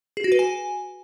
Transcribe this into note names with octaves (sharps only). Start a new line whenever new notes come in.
G#4
F#4
B4
G#5